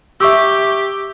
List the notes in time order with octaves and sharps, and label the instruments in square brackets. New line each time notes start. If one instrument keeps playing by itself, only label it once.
[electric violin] G4 [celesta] E5 C#6 E6